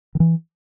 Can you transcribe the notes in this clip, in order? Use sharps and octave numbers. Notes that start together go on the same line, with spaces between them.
D#3
E3